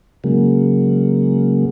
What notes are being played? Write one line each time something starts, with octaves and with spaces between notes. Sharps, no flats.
C#3 F#3 G#3 A#3